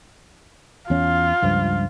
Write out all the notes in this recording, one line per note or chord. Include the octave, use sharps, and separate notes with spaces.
E2 C#4 F4
C#2 G2 F3